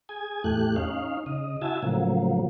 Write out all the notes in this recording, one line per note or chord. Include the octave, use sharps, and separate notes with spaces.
G#4 G#5
E2 A2 A3 G4 F#6
C#4 D#4 F5
C#3 D#5
E4 F#4 E5 G#5 A5
A2 C#3 F3 F#3 A#3